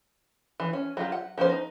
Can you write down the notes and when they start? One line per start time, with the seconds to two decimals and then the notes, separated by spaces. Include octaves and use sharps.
0.60 E3
0.73 C#4
0.97 F#3 F4 G4
1.12 F#5
1.38 F3 B3 C#4 C5
1.49 D#4